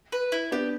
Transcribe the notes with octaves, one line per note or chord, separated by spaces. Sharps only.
B4
E4
B3 D4 G4